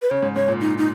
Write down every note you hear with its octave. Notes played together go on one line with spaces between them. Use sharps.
B4
C#3 C#5
G#2
G#2 C#5
A#2
D#4
D#4